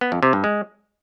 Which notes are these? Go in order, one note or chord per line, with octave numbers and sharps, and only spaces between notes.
B3
F2
C3
G2
G#3